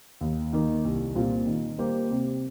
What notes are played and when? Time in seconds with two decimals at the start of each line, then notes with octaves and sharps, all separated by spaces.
0.21 D#2
0.53 D#3 A#3
0.85 C2
1.15 A#2 G3 C4 F4
1.47 D#3
1.79 G3 A#3 G4 C5
2.11 C3